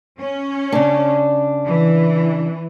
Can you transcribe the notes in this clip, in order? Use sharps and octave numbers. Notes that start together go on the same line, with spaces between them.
C#4
C#3 D4
E3